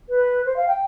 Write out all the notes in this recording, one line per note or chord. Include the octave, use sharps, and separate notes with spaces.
B4
C5
F5
G5